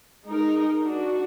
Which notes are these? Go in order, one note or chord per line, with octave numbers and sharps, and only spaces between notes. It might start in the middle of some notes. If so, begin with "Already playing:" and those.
G#3 D#4 A#4
D4 F#4